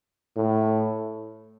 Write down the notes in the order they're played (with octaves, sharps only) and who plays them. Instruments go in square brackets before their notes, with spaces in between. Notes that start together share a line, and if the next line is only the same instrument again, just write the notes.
[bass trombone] A2